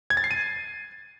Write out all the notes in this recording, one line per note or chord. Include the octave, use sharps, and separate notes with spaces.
G#6
A6
C7
D#7